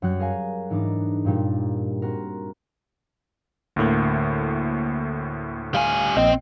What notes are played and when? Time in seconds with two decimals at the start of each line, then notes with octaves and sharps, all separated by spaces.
0.02 F#2 F#3 G3 F#4 F#6 G6
0.19 G#4 A#4 F5 G#5
0.70 G#2 E3 D4 D#4 D6
1.25 G2 A#2 G3
2.02 C4 F#4 A#4
3.76 D2 A2 D3 A#3
5.74 G3 F5 G#5
6.16 A#1 A#2 C4 D#5 G5